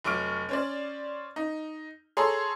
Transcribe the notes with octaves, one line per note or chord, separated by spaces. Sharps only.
F1 F#3 C#6 D6 F6 D7
C#4 C5 D5
D#4
G#4 A4 C#5 A#5 C6